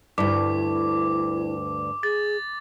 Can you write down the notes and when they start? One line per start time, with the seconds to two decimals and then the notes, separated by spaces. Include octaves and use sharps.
0.18 D2 G2 E4 D6
2.03 G#4 A6